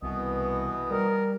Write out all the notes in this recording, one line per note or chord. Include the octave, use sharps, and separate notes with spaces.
C2 B2 E3 B3 D#5
G3 A#4